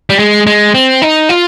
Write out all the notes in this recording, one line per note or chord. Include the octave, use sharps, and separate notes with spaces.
G3
G#3
G#3
C4
D#4
F4